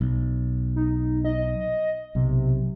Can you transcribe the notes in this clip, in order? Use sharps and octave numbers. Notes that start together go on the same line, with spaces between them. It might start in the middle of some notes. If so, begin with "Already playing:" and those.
B1
D#4
D#5
B1 C3